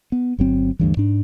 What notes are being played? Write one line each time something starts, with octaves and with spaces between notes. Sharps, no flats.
B3
G1 F#3 C4
D2 G2 E3
G#2 D4